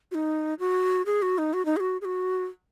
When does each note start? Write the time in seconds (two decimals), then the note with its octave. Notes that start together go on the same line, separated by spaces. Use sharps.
0.11 F#4
0.15 D#4
0.59 F#4
1.06 G#4
1.22 F#4
1.38 D#4
1.53 F#4
1.65 D#4
1.77 G#4
1.80 F#4
2.01 G#4
2.05 F#4